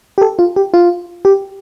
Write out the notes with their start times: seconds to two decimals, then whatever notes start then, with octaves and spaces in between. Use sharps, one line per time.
0.18 G4
0.21 A4
0.39 F4
0.56 G4
0.74 F4
1.25 G4